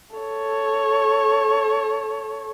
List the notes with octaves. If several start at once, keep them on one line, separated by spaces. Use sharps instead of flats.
A4 C#5